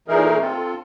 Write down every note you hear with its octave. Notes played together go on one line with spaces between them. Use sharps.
A#2 E3 A3 D#4 G#4 A#4
C4 F4 A4